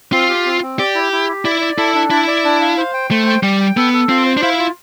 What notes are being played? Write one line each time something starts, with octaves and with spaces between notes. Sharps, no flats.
C4 F4
G4
C4
C4
G4 D5
E4
E4
G4
E4 D5
D5
E4 A4
D4
E4 D5
D5
D4
F5
C5
G5
A3 C5
G5
G3 G5
G5
B3 A4
A4
C4 F4
C5
D4
E4 F5
F4